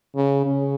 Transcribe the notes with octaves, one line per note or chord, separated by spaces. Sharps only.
C#3
C#3